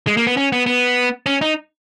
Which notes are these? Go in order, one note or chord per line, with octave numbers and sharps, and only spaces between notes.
G#3
A#3
B3
C#4
B3
B3
C#4
D#4